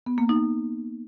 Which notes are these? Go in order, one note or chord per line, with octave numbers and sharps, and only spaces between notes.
B3
A#3
D#4